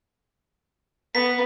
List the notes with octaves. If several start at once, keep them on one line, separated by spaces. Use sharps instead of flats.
B3 B6